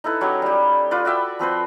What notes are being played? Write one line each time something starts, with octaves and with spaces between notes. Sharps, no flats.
D#4 E4 A4 B4
F#3 C#4 F#4 G4
G3 G4
F4 B4 D5
F#4 D5 E5 G5
F3 C4 B4 C5